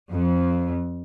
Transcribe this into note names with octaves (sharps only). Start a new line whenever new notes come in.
F2